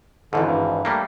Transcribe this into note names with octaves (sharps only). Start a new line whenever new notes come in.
G#1 E2 G#2 D3
G2
G3 A3 A#3